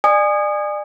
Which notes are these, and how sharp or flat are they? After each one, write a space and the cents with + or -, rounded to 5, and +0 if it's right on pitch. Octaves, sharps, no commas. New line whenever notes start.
D5 +30 G#5 -15 D#6 -25